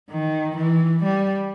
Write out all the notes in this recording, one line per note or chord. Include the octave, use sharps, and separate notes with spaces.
D#3
E3
G3